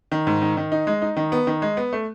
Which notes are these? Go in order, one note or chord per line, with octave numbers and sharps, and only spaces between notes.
D#3
G#2
D#3
D#3
D#4
G#3
D#4
D#3
B3
D#3
G#3
B3
A3